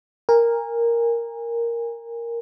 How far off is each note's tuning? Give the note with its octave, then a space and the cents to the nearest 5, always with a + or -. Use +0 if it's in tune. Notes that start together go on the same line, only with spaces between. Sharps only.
A#4 +0 G#5 -30